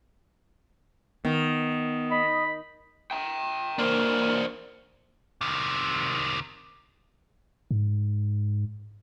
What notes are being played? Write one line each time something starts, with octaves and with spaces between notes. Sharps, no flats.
D#3 B3
D#5 B5
G5 A#5
E3 A#3 D4 A#4 C5
C3 D#3
G#2